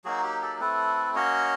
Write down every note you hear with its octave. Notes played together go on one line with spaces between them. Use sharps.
F#3 A#3 D#4 F#4 G#4
G4
G4 A4
A3 C4 E4 A4 B4
A#3 C#4 F#4 C#5 D#5